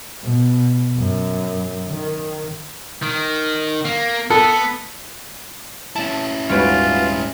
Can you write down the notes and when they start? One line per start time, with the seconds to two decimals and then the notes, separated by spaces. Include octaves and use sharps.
0.23 B2
0.97 F#2
1.88 D#3
3.03 D#3
3.85 A#3
4.30 B3 A4
5.96 C#4 E4 A5
6.50 D#1 G#2 F4 F#4 B4 C#5 D7